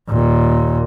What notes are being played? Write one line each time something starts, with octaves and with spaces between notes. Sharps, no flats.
D#2 A#2